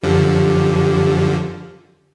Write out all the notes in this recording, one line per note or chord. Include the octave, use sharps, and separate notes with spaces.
F#2 D3 F3 G4